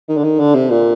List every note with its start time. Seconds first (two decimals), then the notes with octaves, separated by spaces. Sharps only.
0.09 D#3
0.17 D3
0.24 D#3
0.39 D3
0.55 C3
0.70 A#2